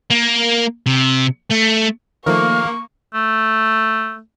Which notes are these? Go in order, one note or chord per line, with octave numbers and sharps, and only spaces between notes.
A#3
C3
A3
D#3 F3 A3 A#3 C#6 F6
A3